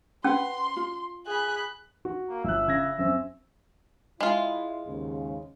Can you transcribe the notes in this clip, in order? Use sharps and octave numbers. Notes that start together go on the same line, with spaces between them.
C#4 B4 F#5 C6
F4
G#4 B5 F#6
F#4
A#3
G1 E5 F#6
C#3 G#6 A#6
F#2 C4 C#4 E5
G#3 E4 F4
D#2 G#2 C#3